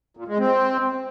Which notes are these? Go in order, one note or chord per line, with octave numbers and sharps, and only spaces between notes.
A#2
G#3
C4